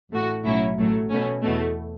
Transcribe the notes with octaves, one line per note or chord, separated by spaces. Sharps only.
A1 A2 A3 F#4
B1 A2 F#3 C#4 E4
A1 A2 F#3 A3
B2 A3 C#4
E2 B2 A3